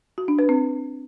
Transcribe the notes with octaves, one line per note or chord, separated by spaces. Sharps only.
F#4
D4
B4
C4